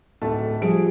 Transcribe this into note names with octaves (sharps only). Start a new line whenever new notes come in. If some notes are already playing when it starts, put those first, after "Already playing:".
D1 A3 A5
F3 G3 G#4 D7